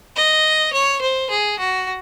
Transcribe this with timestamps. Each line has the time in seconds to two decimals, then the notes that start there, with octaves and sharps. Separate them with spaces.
0.16 D#5
0.73 C#5
1.01 C5
1.30 G#4
1.59 F#4